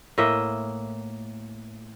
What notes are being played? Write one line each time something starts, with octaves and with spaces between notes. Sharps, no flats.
A2 A#3 D#5 E5